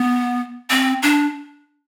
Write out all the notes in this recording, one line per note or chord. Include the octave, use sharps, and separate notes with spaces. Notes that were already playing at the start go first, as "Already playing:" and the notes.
Already playing: B3
C4
D4